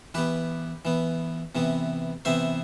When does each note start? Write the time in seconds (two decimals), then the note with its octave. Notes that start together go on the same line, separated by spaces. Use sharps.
0.14 E3 B3 G4 B4
0.85 E3 B3
1.55 C3 E3 B3
2.25 C3 E3 B3 C5 E5